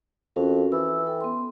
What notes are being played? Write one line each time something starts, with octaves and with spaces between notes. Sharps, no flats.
F2 C#4 F#4 A#4
E3 E6
A4 G5
B3 C6